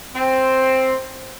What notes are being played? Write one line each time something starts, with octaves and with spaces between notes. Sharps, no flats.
C4